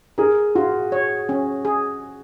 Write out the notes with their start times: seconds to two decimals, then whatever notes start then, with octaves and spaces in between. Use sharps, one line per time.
0.18 G#4 A#4
0.55 F4 F#4
0.92 C#5
1.29 C#4
1.65 G#4